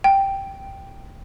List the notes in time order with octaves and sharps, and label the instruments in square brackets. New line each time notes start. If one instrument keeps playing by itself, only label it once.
[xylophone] G5